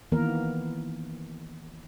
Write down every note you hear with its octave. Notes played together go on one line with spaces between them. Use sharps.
D#3 E3 A#3 B3 A#4